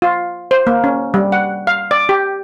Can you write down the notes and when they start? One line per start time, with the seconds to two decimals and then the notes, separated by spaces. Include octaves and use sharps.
0.02 F4
0.51 C5
0.67 A#3
0.84 C#4
1.14 G3
1.32 F#5
1.67 F5
1.91 D5
2.09 G4